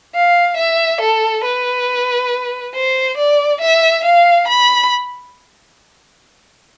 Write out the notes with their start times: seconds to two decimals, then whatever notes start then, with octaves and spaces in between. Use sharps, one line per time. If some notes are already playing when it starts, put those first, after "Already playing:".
0.15 F5
0.57 E5
1.01 A4
1.44 B4
2.75 C5
3.17 D5
3.61 E5
4.04 F5
4.48 B5